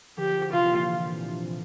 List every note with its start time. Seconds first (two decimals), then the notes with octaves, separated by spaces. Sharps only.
0.17 D3 F3 G4
0.52 C3 E3 F4
0.70 A#2 D3